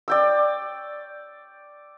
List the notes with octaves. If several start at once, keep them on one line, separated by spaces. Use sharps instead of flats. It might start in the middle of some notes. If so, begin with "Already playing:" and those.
D5 G5 E6